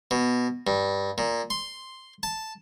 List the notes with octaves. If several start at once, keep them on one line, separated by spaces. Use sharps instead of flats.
B2
G2
A#2
C6
A5